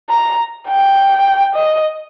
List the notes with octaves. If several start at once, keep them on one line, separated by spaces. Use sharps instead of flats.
A#5
G5
D#5